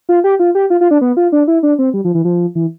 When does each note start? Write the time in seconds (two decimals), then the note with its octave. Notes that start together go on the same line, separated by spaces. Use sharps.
0.09 F4
0.24 G4
0.40 F4
0.55 G4
0.70 F4
0.81 F4
0.91 D4
1.01 B3
1.17 F4
1.32 D4
1.48 E4
1.63 D4
1.79 C4
1.94 G3
2.04 F3
2.14 E3
2.25 F3
2.55 E3